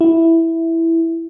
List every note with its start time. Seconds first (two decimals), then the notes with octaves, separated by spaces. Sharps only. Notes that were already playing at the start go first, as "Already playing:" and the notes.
0.01 E4